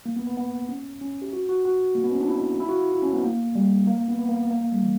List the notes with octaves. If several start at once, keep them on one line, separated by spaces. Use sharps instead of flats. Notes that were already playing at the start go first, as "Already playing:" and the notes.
A#3
B3
B3
B3
C#4
C#4
G4
F#4
F#4
F#4
A#3
B3
C#4
D4
E4
E4
F#4
E4
E4
C#4
B3
A#3
G3
A#3
A#3
B3
B3
A#3
B3
A#3
A#3
G3
E3